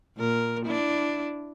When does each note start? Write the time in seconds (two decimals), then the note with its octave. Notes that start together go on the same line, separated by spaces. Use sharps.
0.17 A#2 A#4
0.65 D4 E4